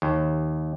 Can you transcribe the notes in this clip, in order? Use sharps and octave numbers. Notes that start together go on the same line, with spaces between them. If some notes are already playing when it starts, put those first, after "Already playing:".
D#2